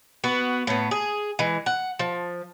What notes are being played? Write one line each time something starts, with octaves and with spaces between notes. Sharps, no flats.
B3 F#4
A2 B3
G#4
E3 G#3
F#5
F3